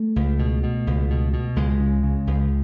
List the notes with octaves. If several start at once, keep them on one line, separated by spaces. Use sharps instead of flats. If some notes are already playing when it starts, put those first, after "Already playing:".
Already playing: A3
C#2
B2
B2
C#2
B2
B2
C#2 G#3
C#3
C#3
C#2